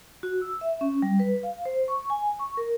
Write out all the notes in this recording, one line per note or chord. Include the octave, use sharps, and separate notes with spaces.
F#4
E6
E5
C#4
G3
B4
F5
C5
C#6
G#5
C#6
A#4